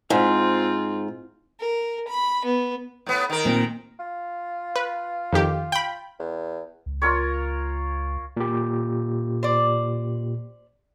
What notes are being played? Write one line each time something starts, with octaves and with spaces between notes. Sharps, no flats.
G#2 C4 F4
A#4
B5
B3
A2 B3
D#3 A#4
A#2 C4
F4
B4
F2 D#3 G4
G5 B5
E2
C#2
F4 A#4 C#5
A#2 G4
C5 D5